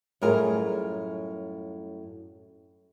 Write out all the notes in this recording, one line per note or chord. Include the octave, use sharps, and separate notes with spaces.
F#2 A2 G3 F4 G#4 A#4